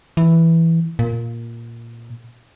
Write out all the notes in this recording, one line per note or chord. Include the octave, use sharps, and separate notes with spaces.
E3
A#2